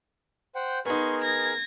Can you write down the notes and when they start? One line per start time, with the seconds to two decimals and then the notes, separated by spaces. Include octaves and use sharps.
0.55 C5 F#5 G5
0.86 B3 D#4 G#4 A#4 C6 C#6
1.22 G#6 A#6